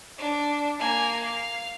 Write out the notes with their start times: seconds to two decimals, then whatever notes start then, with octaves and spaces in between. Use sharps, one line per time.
0.18 D4
0.79 A#3 G#5
1.24 F5